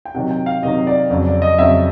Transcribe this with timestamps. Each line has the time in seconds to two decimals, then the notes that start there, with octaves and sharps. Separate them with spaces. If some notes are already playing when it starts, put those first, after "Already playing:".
0.05 G5
0.15 C3 D#3 F#3 F#5
0.31 G5
0.46 F5
0.62 C3 D#3 F#3 D#5
0.87 D5
1.10 F2 C#3 F#3
1.26 D5
1.42 D#5
1.58 F2 C#3 F#3 E5